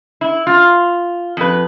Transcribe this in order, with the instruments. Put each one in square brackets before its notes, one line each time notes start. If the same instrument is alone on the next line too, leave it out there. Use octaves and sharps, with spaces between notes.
[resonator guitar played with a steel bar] E4
F4
F2 B4